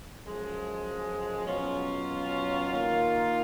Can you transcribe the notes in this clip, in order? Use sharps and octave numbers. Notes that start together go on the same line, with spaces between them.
F#2 F3 G#3
B2 F#3 C#4 F4
D#3 A#3 F4